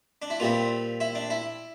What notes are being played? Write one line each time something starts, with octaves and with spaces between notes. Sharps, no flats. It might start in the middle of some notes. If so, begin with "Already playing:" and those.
D4
E4
A#2 G3 C4 F4
E4
D4
E4